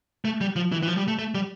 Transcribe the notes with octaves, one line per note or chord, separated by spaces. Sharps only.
A3
G3
F3
E3
E3
F3
G3
A3
A3
G3